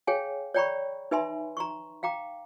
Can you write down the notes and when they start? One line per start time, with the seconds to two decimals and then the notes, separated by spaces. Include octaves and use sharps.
0.07 G#4 C#5 F5 G5 G#5
0.54 C#5 D5 G5 A#5 B5 C#6
1.11 D#4 B4 E5 G#5 B5 C6
1.57 A#5 C6 C#6
2.03 F5 G5 A#5 D6